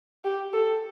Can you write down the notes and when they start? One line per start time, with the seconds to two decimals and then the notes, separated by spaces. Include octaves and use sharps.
0.25 G4
0.53 A4